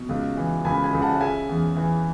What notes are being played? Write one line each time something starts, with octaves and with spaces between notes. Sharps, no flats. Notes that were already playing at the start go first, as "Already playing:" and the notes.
Already playing: B2
C#2
E3
C#2 G#5 B5
G#5 B5
C#2
F#5 A5
F#5
C#3 E5 G#5
E2
E3